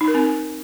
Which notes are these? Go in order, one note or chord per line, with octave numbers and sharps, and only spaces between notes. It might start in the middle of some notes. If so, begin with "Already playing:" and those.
D#4
A#4
C4